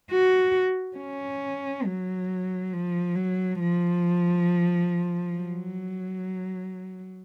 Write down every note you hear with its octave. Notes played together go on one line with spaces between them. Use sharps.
F#4
C#4
F#3
F3
F#3
F3
F#3